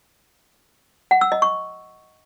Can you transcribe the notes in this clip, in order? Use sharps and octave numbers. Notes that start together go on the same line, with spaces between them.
F#5
E6
D#5
C#6